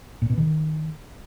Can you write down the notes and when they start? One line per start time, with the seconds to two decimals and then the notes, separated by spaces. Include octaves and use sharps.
0.22 A#2
0.30 B2
0.38 D#3